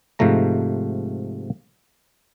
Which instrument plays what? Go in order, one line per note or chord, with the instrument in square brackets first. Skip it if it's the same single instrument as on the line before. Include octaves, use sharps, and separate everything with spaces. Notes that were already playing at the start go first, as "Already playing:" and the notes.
[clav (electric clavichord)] G#2 C3 F3 A3 A#5